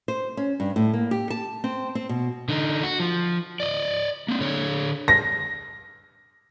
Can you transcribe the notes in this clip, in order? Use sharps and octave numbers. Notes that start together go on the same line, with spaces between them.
C5
C#4
G2
A2
A#3
G4
A5
C4
C4
B2
D3 D#4
F#4
F3
D5 D#5
A#3 C4
D3 C#5
A#6